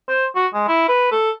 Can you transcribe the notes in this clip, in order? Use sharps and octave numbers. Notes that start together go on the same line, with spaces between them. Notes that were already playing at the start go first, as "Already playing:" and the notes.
C5
F#4
G#3
E4
B4
A4